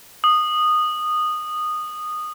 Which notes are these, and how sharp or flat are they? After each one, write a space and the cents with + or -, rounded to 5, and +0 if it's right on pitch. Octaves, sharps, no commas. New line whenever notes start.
D#6 -15